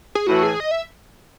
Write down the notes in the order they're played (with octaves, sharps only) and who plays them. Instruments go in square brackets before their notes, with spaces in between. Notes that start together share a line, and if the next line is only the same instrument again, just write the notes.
[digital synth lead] G#4
[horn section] A2 E3 A3 [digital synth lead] F#4
[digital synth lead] G#4
D#5
E5